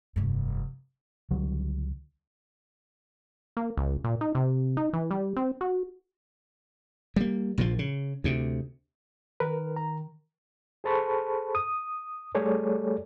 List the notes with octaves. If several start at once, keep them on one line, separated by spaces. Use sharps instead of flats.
F1 G2
C#2 D3 F#3 G3
A#3
C#2
A#2
D#4
C3
D#4
E3
G3
C4
F#4
G3 A#3
A#1 A#2 D3 F3
C#3
D2 C3
D#3 A#4 B4
A#5
G#4 A4 C5 A5 B5 C#6
D#6
G3 A3 G#4 A4 C#5 D5